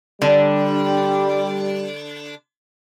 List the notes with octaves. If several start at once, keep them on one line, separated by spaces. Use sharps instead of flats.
D3 G3 D4